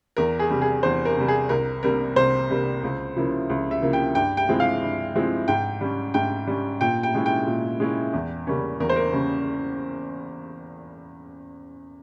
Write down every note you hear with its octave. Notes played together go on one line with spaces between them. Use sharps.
E2 A#4
G#4
C3 G3
G#4
E2 C5
A#4
C3 G3
G#4
C2 A#4
C3 G3 A#3 A#4
C2 C5
C3 G3 A#3
C#2
C#3 F3 A#3 E4
C#2
E5
C#3 F3 A#3 E4
G5
G2 G5
G5
F3 G#3 C4 E4
F5
G2
F3 G#3 C4 E4
G#2 G5
G3 C#4
G#2 G5
G3 C#4
A#2 G5
G5
G#3 C#4 E4
G5
A#2
G#3 C#4 E4
E2
C#3 G3 A#3 C#4
E2 A#4
C5
A#4
C#3 G3 A#3 C#4